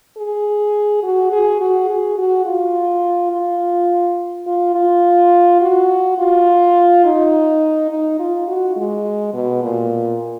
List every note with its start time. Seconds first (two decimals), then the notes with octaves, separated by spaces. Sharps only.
0.17 G#4
1.03 F#4
1.32 G#4
1.61 F#4
1.89 G#4
2.18 F#4
2.46 F4
3.32 F4
4.47 F4
4.75 F4
5.61 F#4
6.18 F4
7.05 D#4
7.90 D#4
8.19 F4
8.48 F#4
8.76 G#3
9.34 B2
9.63 A#2